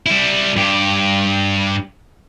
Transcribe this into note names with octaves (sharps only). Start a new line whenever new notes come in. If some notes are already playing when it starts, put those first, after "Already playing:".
G3 E4
G2 G4